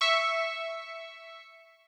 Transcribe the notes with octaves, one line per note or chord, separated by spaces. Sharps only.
E5 C#6